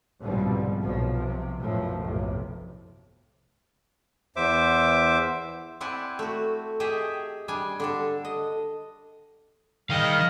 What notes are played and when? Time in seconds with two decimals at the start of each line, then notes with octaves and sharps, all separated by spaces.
0.20 C2 G#2 B2 D3 F3 G3
0.81 B1 B2 F3
1.14 C3
1.59 B1 F#2 A2 F3 A3
2.03 F#1 B1 F2 A2 C3
4.36 E2 C5 E5 D6
5.81 C4 E4 D5 F#5 G#5
6.19 A3 F#4
6.80 G4 G#4 D#5 E5
7.48 G3 D4 G#5
7.80 D3 D4 A4
8.25 D#5
9.90 G#2 D#3 G3 D#5 F5 G5 F6